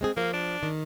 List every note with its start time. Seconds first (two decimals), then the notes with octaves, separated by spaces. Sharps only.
0.01 G#3 C4 G#4
0.17 F3 A#3
0.33 D4
0.63 D#3